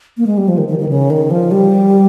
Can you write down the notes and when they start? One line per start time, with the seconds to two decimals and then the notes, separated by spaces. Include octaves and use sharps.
0.17 A#3
0.27 G#3
0.38 G3
0.48 F3
0.58 D#3
0.68 D#3
0.79 D#3
0.89 C#3
1.10 D#3
1.31 F3
1.51 G3